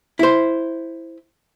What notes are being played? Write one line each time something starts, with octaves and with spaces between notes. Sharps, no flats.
E4 C5